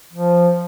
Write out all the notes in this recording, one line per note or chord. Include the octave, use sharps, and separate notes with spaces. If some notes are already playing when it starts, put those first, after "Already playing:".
F3